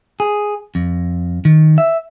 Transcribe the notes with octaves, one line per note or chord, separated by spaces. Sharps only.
G#4
F2
D#3
E5